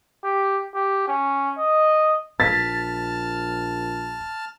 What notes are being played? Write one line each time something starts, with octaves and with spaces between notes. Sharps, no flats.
G4
G4
C#4
D#5
A#1 A5 F6 A6 B6